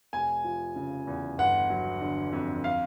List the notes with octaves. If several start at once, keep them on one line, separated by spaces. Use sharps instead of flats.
F1 G#5
F3
C#3
E2
G1 F#5
F#3
D3
F2
F5